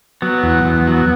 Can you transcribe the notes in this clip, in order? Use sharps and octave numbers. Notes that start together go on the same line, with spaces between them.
F#3 B3
E2
E2
F#3